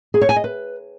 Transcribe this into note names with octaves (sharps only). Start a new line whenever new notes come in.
G#4
C#5
G#5
D#5
B4